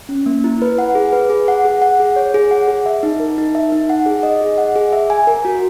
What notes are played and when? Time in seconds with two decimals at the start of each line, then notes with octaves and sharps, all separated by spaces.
0.09 C#4
0.26 A#3
0.44 E4
0.62 B4
0.78 F#5
0.95 G#4
1.13 B4
1.30 G#4
1.48 F#5
1.65 G#4
1.82 F#5
2.00 G#4
2.16 C#5
2.34 G#4
2.51 F#5
2.68 G#4
2.86 E5
3.03 D#4
3.20 A#4
3.38 D#4
3.55 E5
3.72 D#4
3.90 F#5
4.06 G#4
4.23 D#5
4.42 G#4
4.58 F#5
4.76 G#4
4.93 E5
5.10 G#5
5.27 A#4
5.45 F#4